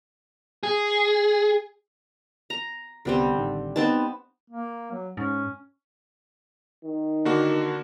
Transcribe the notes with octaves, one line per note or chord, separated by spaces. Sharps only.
G#4
A#5
C2 D3 G3 B3 C4
A1 D#3
B3 C4 D#4 B4 A5
A#3
F#3
G#2 C#4
D#3
D3 A#3 F#4